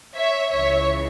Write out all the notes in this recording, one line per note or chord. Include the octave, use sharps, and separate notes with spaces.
C#5 E5
C#2 C#3 E3 C#5 E5